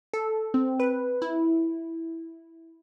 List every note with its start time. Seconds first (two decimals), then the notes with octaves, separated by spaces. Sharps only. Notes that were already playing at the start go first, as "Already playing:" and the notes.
0.14 A4
0.54 C4
0.80 B4
1.22 E4